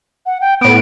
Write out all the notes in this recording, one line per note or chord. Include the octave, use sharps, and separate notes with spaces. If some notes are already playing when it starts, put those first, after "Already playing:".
F#5
G5
A2 B3 D7